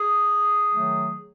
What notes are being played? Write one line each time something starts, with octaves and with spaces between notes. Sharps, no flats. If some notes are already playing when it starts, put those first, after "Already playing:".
Already playing: G#4
D#3 F#3 A3